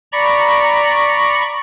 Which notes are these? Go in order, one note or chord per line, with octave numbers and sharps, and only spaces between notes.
D5 A#5 B5 C#6